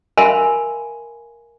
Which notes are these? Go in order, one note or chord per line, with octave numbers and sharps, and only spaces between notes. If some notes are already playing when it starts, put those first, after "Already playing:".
A#4 E5 F5 G#5 B5 C6